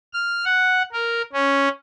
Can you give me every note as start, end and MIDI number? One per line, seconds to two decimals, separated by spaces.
0.13 0.45 89
0.45 0.83 78
0.93 1.22 70
1.33 1.68 61